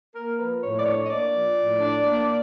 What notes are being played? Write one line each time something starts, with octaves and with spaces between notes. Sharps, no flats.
A#3 A#4
F3 B4
A2 C#5
D5
D4 C#5
D#5
A#3 D5
F3
A2
D4
A#3